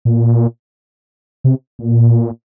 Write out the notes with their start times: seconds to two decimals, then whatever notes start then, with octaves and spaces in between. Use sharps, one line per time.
0.05 A#2
1.44 C3
1.79 A#2